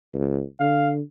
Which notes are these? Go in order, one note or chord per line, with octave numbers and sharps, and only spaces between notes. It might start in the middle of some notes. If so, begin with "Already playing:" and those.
C#2
D3 F5